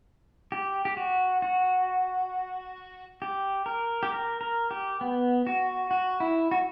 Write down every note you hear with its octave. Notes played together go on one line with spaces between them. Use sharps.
G4
G4
F#4
F#4
G4
A#4
G4
A#4
A#4
G4
B3
F#4
F#4
E4
F#4